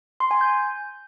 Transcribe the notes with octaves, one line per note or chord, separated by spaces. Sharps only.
C6
G#5
G6